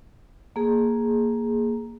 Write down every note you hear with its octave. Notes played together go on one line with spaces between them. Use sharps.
A#3 G#4